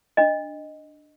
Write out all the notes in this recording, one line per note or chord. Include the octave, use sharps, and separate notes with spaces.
D4 D#5